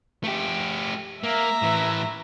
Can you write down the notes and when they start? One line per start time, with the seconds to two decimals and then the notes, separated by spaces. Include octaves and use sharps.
0.24 A3 G4
1.23 A#3 E5 A#5
1.62 A2 E3